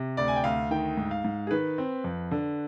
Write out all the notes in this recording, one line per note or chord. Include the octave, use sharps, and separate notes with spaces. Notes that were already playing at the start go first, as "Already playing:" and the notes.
Already playing: C3
D2 D5
G#5
G5
D2 F5
D#3 G5
G#2
F5
G#2
G#4
D#3 B4
C4
F2
D3